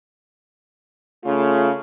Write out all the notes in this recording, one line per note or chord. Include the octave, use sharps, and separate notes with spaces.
C#3 A3 F4